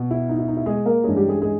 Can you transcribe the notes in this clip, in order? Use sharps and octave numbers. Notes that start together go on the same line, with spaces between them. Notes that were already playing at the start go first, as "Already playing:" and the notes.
Already playing: B2
E4
D#4
E4
D#4
E4
G#3 G#4
A#3 A#4
G2 E3 G#3 C#4 G#4
G3 G4
G#3 G#4
G#3 G#4